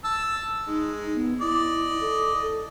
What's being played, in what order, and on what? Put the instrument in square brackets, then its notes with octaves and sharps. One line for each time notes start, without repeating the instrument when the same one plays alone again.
[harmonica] A5 E6
[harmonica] G#3 [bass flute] D#4
[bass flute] B3
[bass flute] E4 [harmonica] D5 D#5
[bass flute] A4
A4